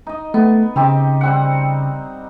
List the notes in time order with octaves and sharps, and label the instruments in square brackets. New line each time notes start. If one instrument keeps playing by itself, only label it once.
[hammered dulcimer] D#4 D#5
[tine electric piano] A3 [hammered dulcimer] B3
[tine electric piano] C#3 [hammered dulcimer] C4 D#4 G4
[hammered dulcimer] G3 C4 F#5